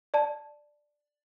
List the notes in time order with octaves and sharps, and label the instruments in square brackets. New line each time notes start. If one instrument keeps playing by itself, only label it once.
[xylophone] D5 A5